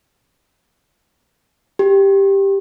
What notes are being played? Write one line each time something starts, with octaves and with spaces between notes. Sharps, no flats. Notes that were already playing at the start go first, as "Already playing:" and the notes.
G4